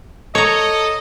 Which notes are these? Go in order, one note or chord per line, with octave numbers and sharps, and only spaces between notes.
A4 C#5 D#5 A#5